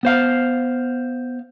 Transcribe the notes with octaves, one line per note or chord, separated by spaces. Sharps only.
B3 C5 F5